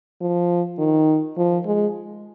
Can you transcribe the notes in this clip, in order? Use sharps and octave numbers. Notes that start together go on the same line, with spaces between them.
F3
D#3
F3
G#3